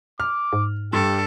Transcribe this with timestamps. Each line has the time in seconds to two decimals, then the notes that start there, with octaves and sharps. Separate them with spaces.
0.20 D6 F6
0.53 G#2
0.93 G2 G4 A4